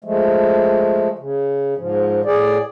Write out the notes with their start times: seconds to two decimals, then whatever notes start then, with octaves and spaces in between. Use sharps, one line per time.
0.05 F3 G#3 A3
1.19 C#3
1.77 G#2 F3
2.25 A2 G#4 D5